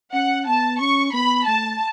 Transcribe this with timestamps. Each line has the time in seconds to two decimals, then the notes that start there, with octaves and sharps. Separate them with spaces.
0.13 C#4 F#5
0.47 B3 A5
0.81 C#4 C#6
1.13 B3 B5
1.47 A3 A5